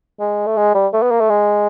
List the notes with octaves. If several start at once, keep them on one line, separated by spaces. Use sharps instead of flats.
G#3
A3
G#3
G3
A3
B3
A#3
A3
G#3